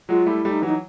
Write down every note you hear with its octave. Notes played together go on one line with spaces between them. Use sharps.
F#3 G#3 F4
G3 A3 E4
G3 A3
D#4
E3 F#3 D#4